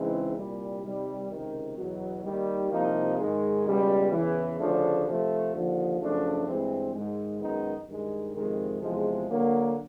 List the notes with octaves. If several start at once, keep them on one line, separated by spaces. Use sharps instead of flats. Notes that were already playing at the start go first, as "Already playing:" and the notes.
Already playing: C#3 E3 G#3 C4 D#4
C2 A#2 G3
C3 D#3 G3
C#2 C3 D#3
E2 B2 F#3
D#2 D#3 G3
C2 C3 F3 A#3 D#4
G#2 D#3 G#3
C#2 B2 G3 B3
E2 C#3 E3
D2 C#3 F3 A3 D4
C3 F3 A3
D#2 D3 F3
F#2 C#3 F3 A3 D4
G2 E3 G#3 C4
G#2 D#3 G#3
F#2 D#3 G#3 B3 D#4
G2 D#3 G#3
F2 C3 D#3 G#3
E2 C3 F3 G#3
D3 F#3 A#3